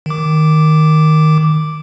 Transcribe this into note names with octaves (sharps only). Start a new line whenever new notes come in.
D#3 D6